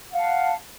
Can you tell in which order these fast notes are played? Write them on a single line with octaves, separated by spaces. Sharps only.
F#5 F5 A5